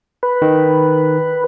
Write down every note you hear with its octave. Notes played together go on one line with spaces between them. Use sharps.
B4
D#3